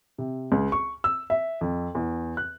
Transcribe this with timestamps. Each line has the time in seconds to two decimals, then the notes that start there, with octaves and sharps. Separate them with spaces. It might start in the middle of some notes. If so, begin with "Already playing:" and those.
0.18 C3
0.52 C#2
0.72 C#6
1.04 E6
1.30 E5
1.61 F2
1.95 E2
2.37 F#6